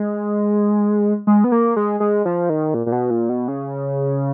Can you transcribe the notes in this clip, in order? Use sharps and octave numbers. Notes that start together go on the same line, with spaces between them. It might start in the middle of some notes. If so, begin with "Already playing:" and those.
Already playing: G#3
G#3
B3
A#3
G#3
G#3
F3
D#3
A#2
A#2
B2
A#2
B2
C#3